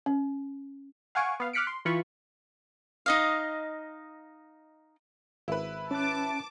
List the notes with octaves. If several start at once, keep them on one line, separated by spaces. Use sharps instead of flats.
C#4
F5 F#5 G#5 C#6 D7
B3 F5
D6 F6 F#6 B6 C#7 D7
C6
E3 F4 B5 C#6
D#4 D#5 F5
G#1 E4 B4
C#4 A5 D6 F#6